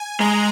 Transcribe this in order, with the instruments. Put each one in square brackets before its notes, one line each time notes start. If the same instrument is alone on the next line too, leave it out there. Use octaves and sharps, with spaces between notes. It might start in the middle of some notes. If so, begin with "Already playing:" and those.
Already playing: [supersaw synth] G#5
[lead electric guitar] G#3 [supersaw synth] A#5